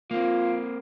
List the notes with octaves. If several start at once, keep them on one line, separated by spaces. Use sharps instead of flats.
A#3 C4 F4